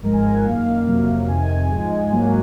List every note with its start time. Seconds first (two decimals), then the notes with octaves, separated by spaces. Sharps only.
0.03 G#1 G#2 F3 G#3 A#4
0.13 G#5
0.24 G#5
0.34 F#5
0.44 F#2 D#3 A#3 F5
0.86 F2 C3 F#3 A#3
1.28 F2 C3 D#3 G#5
1.70 G#2 F3 G#3
2.11 G#2 F#3 A#3